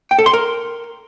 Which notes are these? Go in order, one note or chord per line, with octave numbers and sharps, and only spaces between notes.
G5
A4
C6
A#4